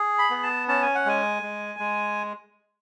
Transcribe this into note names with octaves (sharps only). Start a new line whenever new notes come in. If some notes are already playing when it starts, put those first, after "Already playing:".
Already playing: G#4
B5
B3
A5
C#4 A5
G#5
F#5
G#3 G#5
G#3
G#3